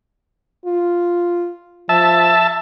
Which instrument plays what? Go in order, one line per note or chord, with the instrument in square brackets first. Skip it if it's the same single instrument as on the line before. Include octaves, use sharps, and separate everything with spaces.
[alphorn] F4
[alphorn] F3 [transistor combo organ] E5 A5